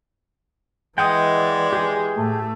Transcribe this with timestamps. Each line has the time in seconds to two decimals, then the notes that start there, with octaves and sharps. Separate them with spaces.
0.98 E3 G#3 D#5 F#5 G5
1.36 D5
1.73 G4 G#4
2.16 A2 A3